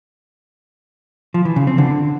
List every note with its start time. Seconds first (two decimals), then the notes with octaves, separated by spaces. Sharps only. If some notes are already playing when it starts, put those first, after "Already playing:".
1.34 F3
1.45 E3
1.56 C#3
1.67 C4
1.78 D3